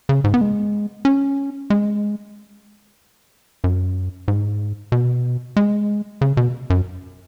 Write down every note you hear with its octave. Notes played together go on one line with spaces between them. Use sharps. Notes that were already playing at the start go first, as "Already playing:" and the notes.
C#3
G#2
B3
G#3
C#4
G#3
F#2
G#2
B2
G#3
C#3
B2
F#2